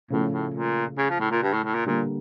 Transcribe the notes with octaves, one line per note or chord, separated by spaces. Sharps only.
A2 C#3 F3 A3 C#4
A2
A#2
C#3
F3
A2
A#2
G2
A2
A2
A#2
A#2 D3 G3 A#3